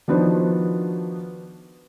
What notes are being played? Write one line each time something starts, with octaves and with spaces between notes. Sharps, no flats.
D#3 F3 B3 D4 F#4 C5